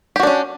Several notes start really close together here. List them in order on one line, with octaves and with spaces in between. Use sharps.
G4 F#4 D4 C#4